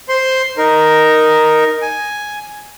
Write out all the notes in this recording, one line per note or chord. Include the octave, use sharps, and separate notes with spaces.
C5 C6
D#4 A#4
G#5